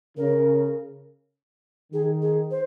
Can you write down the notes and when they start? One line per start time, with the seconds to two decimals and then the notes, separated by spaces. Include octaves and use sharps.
0.17 C#3 A#4
1.93 D#3 G#4
2.22 G#4
2.51 C5